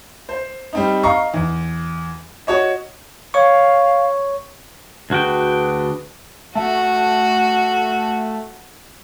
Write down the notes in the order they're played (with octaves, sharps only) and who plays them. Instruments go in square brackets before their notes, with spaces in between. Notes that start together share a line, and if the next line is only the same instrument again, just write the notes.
[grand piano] C5
G3 C4 D#4
D#5 F5 A#5 C#6
E2
F#4 C#5 D#5
[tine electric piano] C#5 C#6 [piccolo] F5
[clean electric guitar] D2 F#4 G5 [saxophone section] D4 G#4 B4
[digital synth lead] A3 [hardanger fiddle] F#4